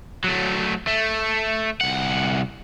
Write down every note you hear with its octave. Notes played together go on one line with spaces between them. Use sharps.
F#3 A3
A3
C2 F#5